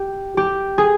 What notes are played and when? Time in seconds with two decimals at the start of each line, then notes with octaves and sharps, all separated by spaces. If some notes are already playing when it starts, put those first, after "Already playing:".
Already playing: G4
0.37 G4
0.78 G#4